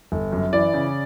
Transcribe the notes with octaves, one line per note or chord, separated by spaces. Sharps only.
G1
F#2
E3 D5
C#3